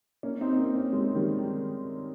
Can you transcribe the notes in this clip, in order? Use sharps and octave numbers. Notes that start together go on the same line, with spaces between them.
A#3 C#4
C4 D#4
D#4
A#3 C#4
A#3 C#4
G#3 C4
D#3 G3
D#3 G3